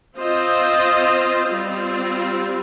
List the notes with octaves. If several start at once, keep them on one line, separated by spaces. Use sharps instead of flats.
C4 F4 C5 D#5
G3 C4 F4